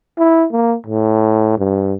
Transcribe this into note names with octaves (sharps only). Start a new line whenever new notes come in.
E4
A#3
A2
G2